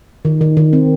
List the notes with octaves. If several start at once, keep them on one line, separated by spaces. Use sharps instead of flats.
D#3
D#3
D#3
C4